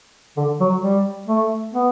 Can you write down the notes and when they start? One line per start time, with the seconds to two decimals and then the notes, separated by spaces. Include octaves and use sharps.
0.37 D3
0.60 F#3
0.83 G3
1.28 A3
1.74 B3